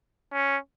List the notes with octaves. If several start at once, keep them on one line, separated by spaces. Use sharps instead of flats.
C#4